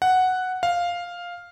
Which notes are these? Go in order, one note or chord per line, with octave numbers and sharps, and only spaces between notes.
F#5
F5